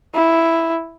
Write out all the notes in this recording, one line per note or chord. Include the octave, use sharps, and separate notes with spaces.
E4